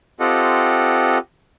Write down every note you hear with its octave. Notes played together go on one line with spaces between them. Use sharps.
C4 F4 G4 A4 D#5 F#5